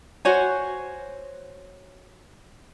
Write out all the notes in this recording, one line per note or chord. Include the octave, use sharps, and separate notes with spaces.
F#4 C5 C#5 G#5